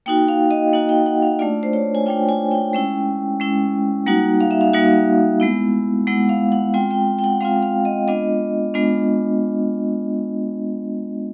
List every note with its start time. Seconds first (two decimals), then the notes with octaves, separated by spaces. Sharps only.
0.06 A#3 D#4 F#4 G5
0.28 F5
0.51 D#5
0.73 A#3 D#4 F#4
0.89 G5
1.06 F#5
1.22 F5
1.39 A3 D4 F4 D5
1.63 C5
1.73 C#5
1.95 G#5
2.06 A3 D4 F4 G5
2.29 G#5
2.51 G5
2.73 G#3 C#4 E4
3.40 G#3 C#4 E4
4.06 G3 A#3 D#4 F#4 F#5
4.41 F5
4.51 E5
4.61 F5
4.74 G3 A#3 D#4 F#4
5.40 G#3 B3 E4
6.07 G#3 B3 E4 F#5
6.29 F5
6.52 F#5
6.74 G#3 C4 F4 G5
6.91 G5
7.19 G5
7.24 F#5
7.41 G#3 C4 F4 F5
7.63 F5
7.85 D#5
8.08 G#3 B3 D4 F4 D#5
8.74 G#3 B3 D4 F4